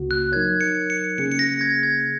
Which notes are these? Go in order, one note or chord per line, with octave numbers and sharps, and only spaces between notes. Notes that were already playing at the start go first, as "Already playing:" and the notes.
Already playing: C#2 C#3 A#3 F#4
F#6
F#3 D#4 A#4 C#5 G#6
C#7
C#7
C#3 A#3 C#4 G#4 C#7
C#7
A#6
G#6
G#6